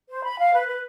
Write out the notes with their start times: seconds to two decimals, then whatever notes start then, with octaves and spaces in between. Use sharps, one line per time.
0.09 C5
0.23 B5
0.38 F5
0.53 B4
0.68 B4